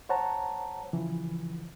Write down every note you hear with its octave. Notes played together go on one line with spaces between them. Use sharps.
C5 C#5 F#5 A5 A#5
C#3 E3 F3